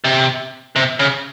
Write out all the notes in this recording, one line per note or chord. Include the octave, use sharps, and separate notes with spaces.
C3
C3
C#3